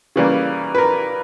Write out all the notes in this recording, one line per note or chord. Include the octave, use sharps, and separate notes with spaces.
C#3 E3 G3 A#3
B4
A#4